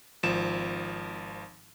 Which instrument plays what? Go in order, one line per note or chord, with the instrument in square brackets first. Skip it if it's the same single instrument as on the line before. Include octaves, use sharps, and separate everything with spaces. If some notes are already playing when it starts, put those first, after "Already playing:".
[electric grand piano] G#1 F3 E7